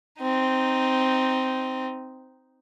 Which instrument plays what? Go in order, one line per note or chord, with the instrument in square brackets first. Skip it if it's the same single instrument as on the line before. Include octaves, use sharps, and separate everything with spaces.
[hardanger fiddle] C4 D#4